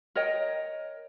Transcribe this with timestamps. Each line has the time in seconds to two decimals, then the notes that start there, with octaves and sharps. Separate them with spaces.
0.15 A#4 C#5 D#5 G5